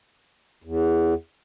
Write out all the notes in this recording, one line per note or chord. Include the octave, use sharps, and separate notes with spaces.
E2